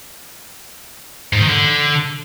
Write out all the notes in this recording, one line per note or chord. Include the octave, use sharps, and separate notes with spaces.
G#2
D#3
D3